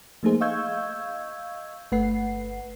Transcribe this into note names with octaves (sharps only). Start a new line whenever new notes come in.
F3 A3 A#3 D#4 G#4 C5
D#5 F5 C#6 E6 G6 G#6
G1 A3 B4 F#5 C7